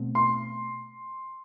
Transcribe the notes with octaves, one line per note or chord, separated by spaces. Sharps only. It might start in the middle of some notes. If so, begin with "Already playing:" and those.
Already playing: B2 A3 C4
C6